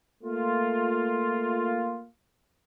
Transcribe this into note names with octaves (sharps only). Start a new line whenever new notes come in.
A3 A#3 F4